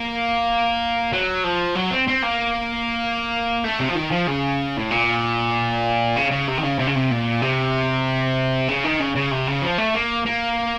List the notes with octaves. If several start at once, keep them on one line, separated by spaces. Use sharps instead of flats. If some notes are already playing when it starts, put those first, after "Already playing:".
Already playing: A#3
F#3
F3
F#3
C4
C4
A#3
A3
C3
F3
D#3
F3
C#3
A2
A#2
C#3
C#3
C3
D#3
C#3
C3
C#3
C3
A#2
C3
C#3
D#3
C#3
C#3
C3
C#3
F3
A3
A#3
A#3